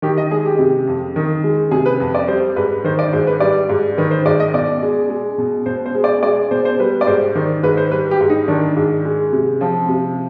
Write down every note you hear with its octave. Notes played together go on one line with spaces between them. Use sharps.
D#3 G4
D#5
G#3 G#4
G4
C3
F2
D#3
G#3
C3 G#4
B4
F2
D5
G3 C5
G#2 B4
D#3 C5
D5
G#2 C5
B4
G3 D5
G#2
D#3 B4
C5
G#2 D5
D#5
B2 D5
G#3
G#3
B2
B2 C5
C5
G#3
D5
G#3 D5
B2 C5
C5
G3 B4
D5
G#2 C5
D#3 C5
G#2 B4
C5
G3 B4
G4
G#2
D#4
D#3 D4
G#2
G#3
C3
F3 C4
C3